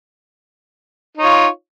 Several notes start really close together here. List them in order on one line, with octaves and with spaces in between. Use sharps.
D#4 C#5 F4